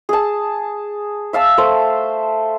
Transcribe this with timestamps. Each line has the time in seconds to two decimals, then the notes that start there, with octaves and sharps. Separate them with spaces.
0.09 G#4 A5
1.33 E5 F5 A5 E6
1.58 A3 C5